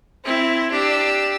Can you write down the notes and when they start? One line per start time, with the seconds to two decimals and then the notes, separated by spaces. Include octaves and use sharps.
0.25 C4 E4
0.72 D4 G4 E6